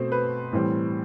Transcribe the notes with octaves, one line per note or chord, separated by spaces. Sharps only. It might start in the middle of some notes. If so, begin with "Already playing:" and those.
Already playing: B2 A3 C4 C5
B4
A2 E3 G3 C4